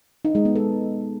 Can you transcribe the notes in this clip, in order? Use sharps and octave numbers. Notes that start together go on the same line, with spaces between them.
D#4
G#3
B3
A4